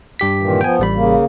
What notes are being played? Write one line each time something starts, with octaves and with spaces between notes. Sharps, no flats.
G2 G4 B6
A#2 D#3 E3
F3 B3 G5 G#5
A1 G3 B5
C#3 A#3